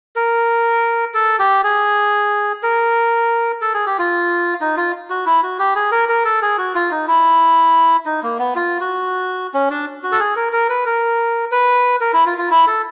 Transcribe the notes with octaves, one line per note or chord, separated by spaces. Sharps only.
A#4
A4
G4
G#4
A#4
A4
G#4
G4
F4
D#4
F4
F#4
E4
F#4
G4
G#4
A#4
A#4
A4
G#4
F#4
F4
D#4
E4
D#4
A#3
B3
F4
F#4
C#4
D4
F#4
A4
G#4
A#4
A#4
B4
A#4
B4
A#4
E4
F4
F4
E4
A4